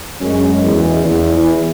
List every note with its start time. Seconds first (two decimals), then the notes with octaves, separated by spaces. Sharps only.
0.20 F#2 G#3 C#4
0.48 G#3 C#4
0.63 E2
0.76 E3 G#3
1.04 E2
1.33 E3